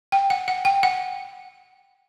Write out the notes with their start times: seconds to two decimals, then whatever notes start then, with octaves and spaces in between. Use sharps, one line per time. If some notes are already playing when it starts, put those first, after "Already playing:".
0.12 G5
0.30 F#5
0.48 F#5
0.65 G5
0.83 F#5